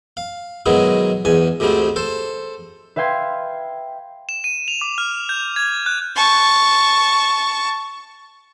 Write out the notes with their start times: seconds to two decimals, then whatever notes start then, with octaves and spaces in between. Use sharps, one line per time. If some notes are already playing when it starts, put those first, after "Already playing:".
0.17 F5
0.66 G#2 B2 D#3 F#3 G#3 E4
1.25 E2 G#2 G#5
1.60 D2 G#2 D3 G3 A3 C4
1.96 A4 C5
2.96 B4 E5 F5 G5 C6 G#6
4.29 E7
4.44 D#7
4.68 F7
4.81 D6
4.98 F6
5.29 G6
5.56 G#6
5.86 F#6
6.16 A5 C#6